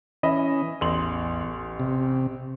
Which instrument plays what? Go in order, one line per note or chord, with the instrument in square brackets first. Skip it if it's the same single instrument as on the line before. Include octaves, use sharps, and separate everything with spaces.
[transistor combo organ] E3 C#4 [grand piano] D#5 E5 B5
[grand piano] A1 C6 F#7 [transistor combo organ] E2
[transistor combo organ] C3